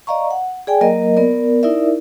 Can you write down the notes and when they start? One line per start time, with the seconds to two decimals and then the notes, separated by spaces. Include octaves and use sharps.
0.07 D5 D#5 F5 A#5 C#6
0.31 F#5
0.67 G#4 D5 G5 G#5
0.81 F#3 A#3 A#4 D#5
1.17 B3 A#4 D5
1.63 D#4 E4 A#4 D5 E5